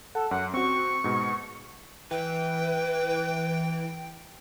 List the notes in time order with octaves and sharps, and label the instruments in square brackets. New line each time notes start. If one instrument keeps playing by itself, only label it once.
[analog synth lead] A4 [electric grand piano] F#5
[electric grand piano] F#2 [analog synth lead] F#5
[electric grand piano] C4 F#4 [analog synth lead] C#6
[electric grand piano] G#2 B2
[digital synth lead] E3 [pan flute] B4 [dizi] G5